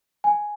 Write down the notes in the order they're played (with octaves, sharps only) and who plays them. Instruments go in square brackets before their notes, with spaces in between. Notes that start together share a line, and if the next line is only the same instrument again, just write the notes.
[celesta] G#5